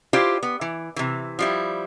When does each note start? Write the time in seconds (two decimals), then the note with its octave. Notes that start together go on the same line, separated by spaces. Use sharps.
0.13 E4 F4 G4 C5 D5
0.43 B3
0.61 E3
0.96 C3 E3
1.39 F3 G3 E4